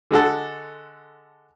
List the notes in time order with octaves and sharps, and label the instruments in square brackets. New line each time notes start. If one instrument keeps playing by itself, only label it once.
[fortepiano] D3 G#3 F#4 A4